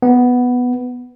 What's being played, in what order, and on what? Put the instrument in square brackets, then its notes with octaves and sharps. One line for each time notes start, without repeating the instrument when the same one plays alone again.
[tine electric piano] B3